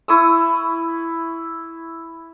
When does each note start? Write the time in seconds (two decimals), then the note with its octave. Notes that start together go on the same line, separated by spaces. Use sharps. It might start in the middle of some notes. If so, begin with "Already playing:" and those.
0.08 E4 C#6 D#6 E6